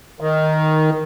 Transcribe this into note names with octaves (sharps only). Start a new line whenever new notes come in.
D#3